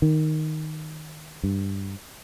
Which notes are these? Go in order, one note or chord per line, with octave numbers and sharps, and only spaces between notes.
D#3
G2